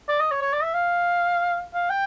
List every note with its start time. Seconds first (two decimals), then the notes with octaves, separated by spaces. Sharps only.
0.08 D5
0.20 D#5
0.31 C#5
0.41 C#5
0.53 D5
0.63 E5
0.74 F5
1.74 F5
1.90 G5